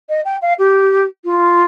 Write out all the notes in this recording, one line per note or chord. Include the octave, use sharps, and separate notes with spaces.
D#5
G5
F5
G4
F4